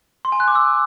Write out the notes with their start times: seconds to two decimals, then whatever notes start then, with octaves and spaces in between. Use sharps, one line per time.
0.25 C6
0.32 G#5
0.40 F#6
0.48 D6
0.55 E6